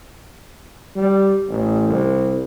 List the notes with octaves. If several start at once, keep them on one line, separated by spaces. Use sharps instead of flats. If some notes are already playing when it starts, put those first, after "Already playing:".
G3
A1
C2